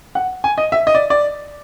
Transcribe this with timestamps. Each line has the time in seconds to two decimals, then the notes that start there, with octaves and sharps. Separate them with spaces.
0.15 F#5
0.44 G#5
0.58 D#5
0.72 E5
0.87 D#5
0.95 D5
1.10 D5